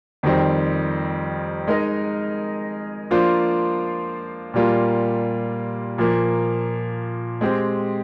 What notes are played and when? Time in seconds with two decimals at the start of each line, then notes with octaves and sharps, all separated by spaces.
0.23 F2 D#3 G3 C4
1.67 G#3 D#4 A#4 D#5
3.11 F3 A#3 D4 F4 C5
4.54 A#2 G3 A#3 F4
5.98 A#2 F3 A#3
7.41 G#3 C4 G4